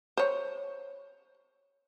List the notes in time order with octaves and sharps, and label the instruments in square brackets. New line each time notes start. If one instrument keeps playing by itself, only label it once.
[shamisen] C5 C#5